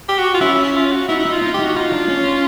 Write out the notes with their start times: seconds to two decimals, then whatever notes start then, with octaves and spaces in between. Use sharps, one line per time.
0.09 G4
0.19 F#4
0.34 F4
0.41 C#4 E4
0.64 E4
0.76 F4
0.92 F#4
1.08 D#4 E4
1.20 E4
1.26 D#4
1.32 F4
1.42 D#4
1.54 D#4 G4
1.64 F#4
1.76 D#4 F4
1.92 D4
2.09 C#4